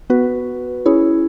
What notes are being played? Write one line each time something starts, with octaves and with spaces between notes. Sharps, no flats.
B3 F#4 B4
C#4 E4 G#4 C#5